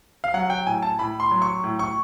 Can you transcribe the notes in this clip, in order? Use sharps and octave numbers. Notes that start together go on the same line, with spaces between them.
F5
F#3 F#5
G5
A2 G#5
A5
A2 B5
C6
F#3
C#6
A2
C#6